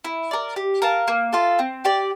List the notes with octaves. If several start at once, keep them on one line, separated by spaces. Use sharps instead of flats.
E4
A#4 D5
G4
A#4 F5 A5
A#3
F4 A4
C4
G4 D5